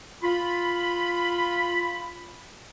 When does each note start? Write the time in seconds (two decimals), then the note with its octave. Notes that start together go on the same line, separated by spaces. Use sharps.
0.24 F4 B5